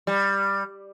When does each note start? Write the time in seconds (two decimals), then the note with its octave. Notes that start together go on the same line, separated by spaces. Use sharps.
0.07 G3